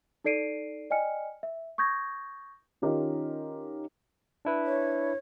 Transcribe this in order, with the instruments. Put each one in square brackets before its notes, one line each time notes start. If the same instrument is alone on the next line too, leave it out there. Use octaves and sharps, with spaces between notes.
[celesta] D#4 A4 D5 C7 D7 D#7
D5 D#5 G5 G#5 F6 C#7
E5
C#6 D#6 G6 G#6 A#6
[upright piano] D#3 C#4 F4 G4 A#4 D#5
[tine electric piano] D4 E4 B4
[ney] C#5